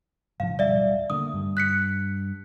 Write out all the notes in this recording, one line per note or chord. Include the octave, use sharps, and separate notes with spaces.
G#2 C#3 F3 F5
D1 B2 G3 D5 E5
D3 A3 A#3 D#6
G2
F#6 B6 C#7